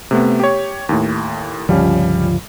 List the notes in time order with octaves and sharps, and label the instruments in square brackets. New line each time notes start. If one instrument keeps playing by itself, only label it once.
[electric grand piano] C3 A3 B3
G4 C#5
D#2 A2
[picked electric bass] G1 C#2 F3 [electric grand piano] G3 C#4